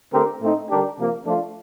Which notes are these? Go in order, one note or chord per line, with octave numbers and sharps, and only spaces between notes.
D3 A3 C4 G4 A#4
A2 A3 C4 D#4
D3 G3 D4 G4 A#4
C3 F3 A#3
F3 A3 D4 F4